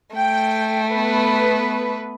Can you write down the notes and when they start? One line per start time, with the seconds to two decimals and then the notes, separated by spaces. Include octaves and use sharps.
0.16 A3 G5
0.92 B3 B4